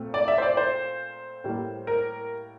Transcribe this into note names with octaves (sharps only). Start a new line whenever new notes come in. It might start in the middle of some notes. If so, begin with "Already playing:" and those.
Already playing: A#2 A3 C4
D5
E5
C5
D5
C5
A2 G3 A#3
A#4